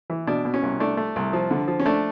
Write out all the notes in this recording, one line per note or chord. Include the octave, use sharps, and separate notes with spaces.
E3
B2 D4
B2
C#4
C2
A3 D4
A3
C2
F3
D3
F3
C#4
A3 D4